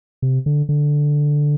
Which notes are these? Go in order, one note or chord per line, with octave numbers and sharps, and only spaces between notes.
C3
D3
D3